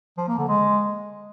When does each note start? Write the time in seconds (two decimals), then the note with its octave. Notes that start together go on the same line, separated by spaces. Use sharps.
0.18 F3
0.28 A#3
0.38 D3
0.48 G#3